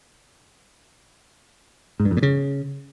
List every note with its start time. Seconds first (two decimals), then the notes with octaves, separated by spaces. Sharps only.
2.00 G#2
2.05 G2
2.11 F2
2.17 A#2
2.23 C#3